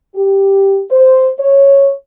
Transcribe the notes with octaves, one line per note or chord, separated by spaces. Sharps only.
G4
C5
C#5